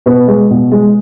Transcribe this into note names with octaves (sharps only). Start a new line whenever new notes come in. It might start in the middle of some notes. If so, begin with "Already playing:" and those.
B2 B4
G#3
B2
G#3